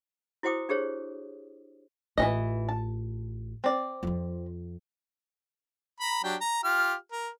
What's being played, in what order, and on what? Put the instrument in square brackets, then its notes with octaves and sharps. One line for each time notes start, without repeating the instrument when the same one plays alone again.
[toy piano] E4 F#4 C5 G5 D6 D#6
D4 G4 G#4 C5 C#5
[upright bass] A1 F4 [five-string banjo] E3 C#4 D#5
[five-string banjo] A5
C4 D5
[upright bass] F2 F3
[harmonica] A#5 B5
F#3 D4 G4
A#5
F4 G4 F6
A#4